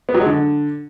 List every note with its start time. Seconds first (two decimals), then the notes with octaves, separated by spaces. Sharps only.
0.09 B3
0.14 F#3
0.20 G#3
0.26 D3